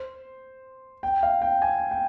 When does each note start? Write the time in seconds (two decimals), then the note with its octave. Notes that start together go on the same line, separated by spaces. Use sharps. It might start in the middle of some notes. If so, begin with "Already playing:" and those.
Already playing: C5
1.03 G5
1.23 F5
1.42 G5
1.62 G#5
1.91 G5